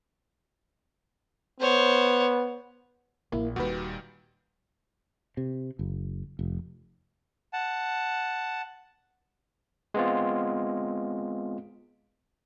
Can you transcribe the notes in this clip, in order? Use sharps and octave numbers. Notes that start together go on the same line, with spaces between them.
B3 C5 C#5
A#1 A#3 E4
D#1 A#2 D#3 G3 F#4 B4
C3
F#1
F1
F#5 A5
G#3 B3 C4 F4